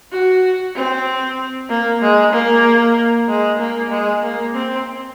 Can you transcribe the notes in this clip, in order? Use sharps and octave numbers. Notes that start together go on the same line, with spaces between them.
F#4
C4
A#3
G#3
A#3
G#3
A#3
G#3
A#3
C4